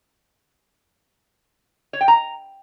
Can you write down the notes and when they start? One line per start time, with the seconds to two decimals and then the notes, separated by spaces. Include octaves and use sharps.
1.93 C#5
2.01 G5
2.08 A#5